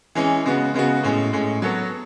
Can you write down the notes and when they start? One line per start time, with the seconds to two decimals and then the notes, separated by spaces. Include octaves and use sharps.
0.15 E3 G#3 C#4
0.45 C#3 G#3 B3 F#4
0.74 C#3 G#3 B3 F#4
1.03 A2 G#3 C#4
1.33 A2 G#3 C#4
1.62 F#3 B3 F#4 A4 C#5